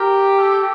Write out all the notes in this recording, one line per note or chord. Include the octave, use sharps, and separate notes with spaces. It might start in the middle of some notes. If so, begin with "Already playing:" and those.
Already playing: G4 A#4
A4